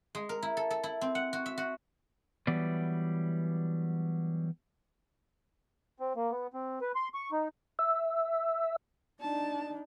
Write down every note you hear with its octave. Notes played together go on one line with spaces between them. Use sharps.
G#3
A#4
E4
A4
A4
E4
C4
F#5
F#4
E5
F#4
E3 F#3 G3 B3 D5
C4
A#3
B3
C4
B4
C6
C#6
D#4
E5
D4 D#4 A5